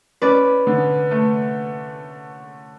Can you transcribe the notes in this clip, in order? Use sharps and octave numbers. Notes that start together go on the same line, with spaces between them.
C#4 B4 D5
D3
A3